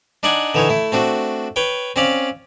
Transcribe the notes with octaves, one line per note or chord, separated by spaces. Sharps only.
D4 D#4 D5 F#5 G#5
D3 E3 D#4 E4 C#5
A3 E4
A3 C4 D4 F#4
B4 C#5 G5
C4 C#4 D5 F5